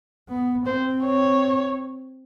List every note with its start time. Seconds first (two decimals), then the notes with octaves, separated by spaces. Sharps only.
0.29 B3
0.66 C4 C5
1.04 C#5